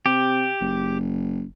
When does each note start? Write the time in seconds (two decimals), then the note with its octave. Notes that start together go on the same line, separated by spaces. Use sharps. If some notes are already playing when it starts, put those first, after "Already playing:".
0.06 C3 G4
0.61 F#1